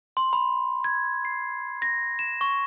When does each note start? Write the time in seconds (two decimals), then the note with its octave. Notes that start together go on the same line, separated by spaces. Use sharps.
0.17 C6
0.33 B5
0.84 G#6
1.25 C7
1.82 A#6
2.19 E7
2.41 C#6